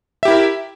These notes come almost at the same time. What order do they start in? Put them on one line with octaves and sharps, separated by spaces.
E5 G4 E4 A#4